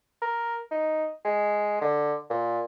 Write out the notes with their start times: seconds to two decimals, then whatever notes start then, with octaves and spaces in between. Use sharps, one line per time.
0.22 A#4
0.71 D#4
1.25 G#3
1.81 D3
2.30 A#2